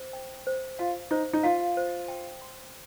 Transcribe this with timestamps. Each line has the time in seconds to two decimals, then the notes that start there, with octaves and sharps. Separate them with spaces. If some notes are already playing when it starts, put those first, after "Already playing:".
Already playing: C5
0.13 G5
0.47 C5
0.79 F4 F5
1.11 D#4 C5
1.33 D#4
1.43 F4 F5
1.77 C5
2.08 G5
2.42 C6